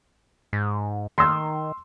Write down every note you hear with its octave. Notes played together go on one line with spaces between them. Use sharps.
G#2
D#3 C6 E6